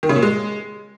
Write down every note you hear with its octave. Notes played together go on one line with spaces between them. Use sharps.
D#3
C#3
A#2
G#3